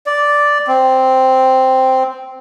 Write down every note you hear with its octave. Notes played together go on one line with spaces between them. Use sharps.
D5
C4